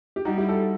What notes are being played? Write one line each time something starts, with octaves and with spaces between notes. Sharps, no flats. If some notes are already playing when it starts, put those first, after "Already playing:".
G4
G3 D#4 F#4
E4 G4
F#4 A4